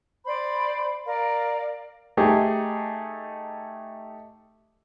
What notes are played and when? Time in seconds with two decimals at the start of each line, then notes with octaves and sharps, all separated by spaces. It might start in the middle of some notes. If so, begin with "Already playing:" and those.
0.25 C5 D5 B5
1.07 A#4 D5 F5
2.17 A3 D#4 G4 G#4